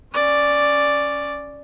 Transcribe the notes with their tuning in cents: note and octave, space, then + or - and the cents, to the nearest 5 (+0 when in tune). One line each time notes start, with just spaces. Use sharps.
C#4 +0 D5 +0